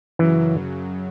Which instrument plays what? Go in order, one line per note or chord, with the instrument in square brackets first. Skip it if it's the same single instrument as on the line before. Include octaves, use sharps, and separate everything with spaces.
[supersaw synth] F#2 C#3 F#3 [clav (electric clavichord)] E3